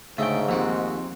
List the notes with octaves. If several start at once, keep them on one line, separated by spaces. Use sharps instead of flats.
D2 G#2 C#3 A3 G5
D#2 F3 C4 F#4